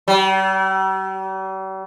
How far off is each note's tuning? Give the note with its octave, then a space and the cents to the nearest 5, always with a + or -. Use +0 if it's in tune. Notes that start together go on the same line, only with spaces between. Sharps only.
G3 -45